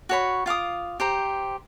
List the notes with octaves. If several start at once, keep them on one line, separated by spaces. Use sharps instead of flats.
F#4 C#5 B5
F4 F5 D6 D#6
G4 C5 A#5